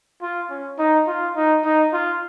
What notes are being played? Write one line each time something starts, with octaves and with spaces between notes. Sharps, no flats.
F4
C#4
D#4
F4
D#4
D#4
F4